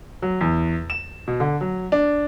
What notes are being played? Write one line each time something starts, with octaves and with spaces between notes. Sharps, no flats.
F#3
E2
E7
B2
D3
F#3
D4